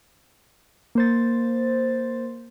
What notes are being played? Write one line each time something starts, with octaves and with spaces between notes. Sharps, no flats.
A#3 C5 A6